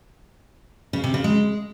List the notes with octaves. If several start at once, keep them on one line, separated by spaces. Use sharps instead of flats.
C#3
C3
C#3
G#3